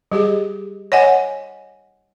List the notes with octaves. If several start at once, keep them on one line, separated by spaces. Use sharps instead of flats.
G3 G4 G#4
C#5 D#5 F#5 G#5